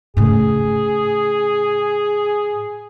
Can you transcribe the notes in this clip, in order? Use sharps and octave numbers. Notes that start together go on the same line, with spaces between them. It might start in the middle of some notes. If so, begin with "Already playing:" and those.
A2 C#3 G#4